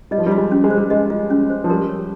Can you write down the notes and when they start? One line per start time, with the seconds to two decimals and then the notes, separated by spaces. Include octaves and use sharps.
0.11 G3 D#5
0.18 F3
0.26 G3
0.31 F4
0.37 G#3
0.51 C#4
0.64 G#3
0.70 C5
0.77 G3
0.90 G#3 D#5
1.10 F4
1.30 C#4
1.50 C5
1.64 F3
1.69 G3 A#4
1.89 C#5